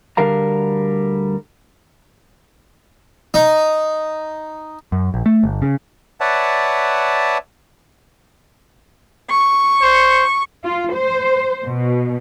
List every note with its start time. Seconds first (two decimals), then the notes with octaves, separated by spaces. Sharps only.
0.17 D2 D3 G3 A#4 F5 A#5
3.34 D#4
4.92 F#2
5.14 A#1
5.26 A3
5.43 G1
5.62 C#3
6.20 B4 C#5 D5 E5 F#5 A5
9.30 C#6
9.82 C5
10.64 F4
10.94 C5
11.66 B2